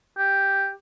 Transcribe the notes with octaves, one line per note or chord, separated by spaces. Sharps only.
G4